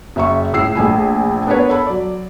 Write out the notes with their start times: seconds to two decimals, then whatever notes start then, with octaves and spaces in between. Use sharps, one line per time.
0.16 F#1 E5 C#6
0.53 C#2 A2 E6 C7
0.75 A#1 A3 G#5 B5
1.47 B3 D4 A#4 B4 C#5
1.70 A4 B5
1.86 F#3 D5